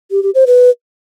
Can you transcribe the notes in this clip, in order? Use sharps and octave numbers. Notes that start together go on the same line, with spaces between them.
G4
G4
C5
B4